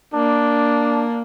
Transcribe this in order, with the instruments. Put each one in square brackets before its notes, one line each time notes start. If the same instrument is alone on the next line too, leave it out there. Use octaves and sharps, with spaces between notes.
[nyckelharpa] A#3 [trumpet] D4